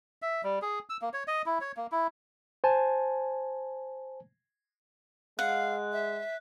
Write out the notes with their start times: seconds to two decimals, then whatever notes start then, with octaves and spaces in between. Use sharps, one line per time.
0.22 E5
0.44 G3
0.62 G#4
0.90 E6
1.02 A#3
1.14 C#5
1.28 D#5
1.46 E4
1.61 C#5
1.77 A#3
1.92 E4
2.64 C5 G#5 A5
5.39 G#3 F5 F#5 F#6
5.92 E5